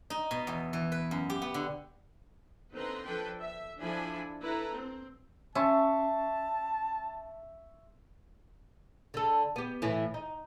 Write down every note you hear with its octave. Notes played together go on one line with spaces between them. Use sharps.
D#4
B2
E2
E3
B4
F#2
G4
B3
D3
D3 C4 D#4 B4 A#5 C6
F3 D4 A4 B4 G5
E5
F3 D4 E4 A4 G#5 B5
E4 A4 B4 A#5
C4
C#4 E5 A5 C6 C#6
D3 A4
B3 G4
A2 E3
D#4